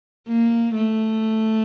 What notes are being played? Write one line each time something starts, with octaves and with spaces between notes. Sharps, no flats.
A#3
A3